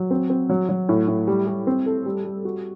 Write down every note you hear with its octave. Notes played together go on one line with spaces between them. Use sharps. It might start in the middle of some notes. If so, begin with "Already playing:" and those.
Already playing: F#3
C4
C4
F#3
F#3
A2
A2
G3
G3
C4
A4
G3
G3
F#4